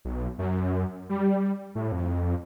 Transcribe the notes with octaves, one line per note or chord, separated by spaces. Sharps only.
B1
F#2
G3
A2
F2